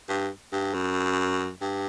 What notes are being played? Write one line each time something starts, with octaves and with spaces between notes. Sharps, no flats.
G2
G2
F#2
G2